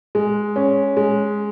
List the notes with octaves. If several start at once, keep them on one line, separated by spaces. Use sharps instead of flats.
G#3
C#4
G#3